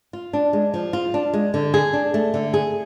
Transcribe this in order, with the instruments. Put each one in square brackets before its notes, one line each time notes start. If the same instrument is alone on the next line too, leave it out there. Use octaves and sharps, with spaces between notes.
[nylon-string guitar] F4
D4
G#3
F3
F4
D4
G#3
D3
G#4
D4
A3
D3
G#4